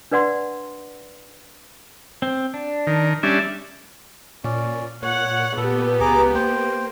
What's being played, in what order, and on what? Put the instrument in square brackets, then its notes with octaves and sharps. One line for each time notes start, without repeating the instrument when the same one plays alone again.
[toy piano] D4 B4 D5 F#5 C6
[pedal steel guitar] C4
D4
[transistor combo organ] D#3
[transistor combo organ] G3 C#4 D4 [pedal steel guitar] E5
[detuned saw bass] A#2 [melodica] C#4 D5
[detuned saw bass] A#2 [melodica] C#5 [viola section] F#5
[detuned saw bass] A#2 [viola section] B3 G4 [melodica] A4
[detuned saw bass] C#2 [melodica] G#4 A#5 D6
[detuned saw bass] A#3 [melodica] C5 G5